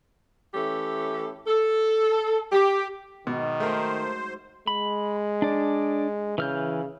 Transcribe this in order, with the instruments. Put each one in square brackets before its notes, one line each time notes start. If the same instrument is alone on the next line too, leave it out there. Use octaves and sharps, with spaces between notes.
[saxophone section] E3 A3 C#4 G4 A4
A4
G4
[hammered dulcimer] G#2 F#3 D6 [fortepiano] B2 [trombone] D#3
[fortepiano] A3 A#4 [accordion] C5
[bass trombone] G#3 [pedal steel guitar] B5
[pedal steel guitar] D4 D5
[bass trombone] C#3 [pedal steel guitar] E3 F6 G6